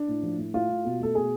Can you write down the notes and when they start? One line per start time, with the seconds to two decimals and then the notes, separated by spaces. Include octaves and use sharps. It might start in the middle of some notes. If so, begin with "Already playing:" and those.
Already playing: D4
0.08 A2
0.23 F3
0.38 A2
0.54 A2 F4
0.69 A2
0.85 B2
1.00 A3 A4
1.15 B2 G#4